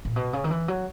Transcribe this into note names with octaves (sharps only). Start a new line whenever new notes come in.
A#2
B2
C#3
D#3
E3
F#3